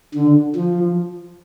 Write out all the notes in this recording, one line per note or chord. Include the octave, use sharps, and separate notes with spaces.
D3
F3